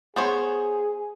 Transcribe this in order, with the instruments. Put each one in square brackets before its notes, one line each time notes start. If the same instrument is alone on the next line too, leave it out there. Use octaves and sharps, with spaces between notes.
[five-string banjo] B3 C5 C#5 [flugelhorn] G#4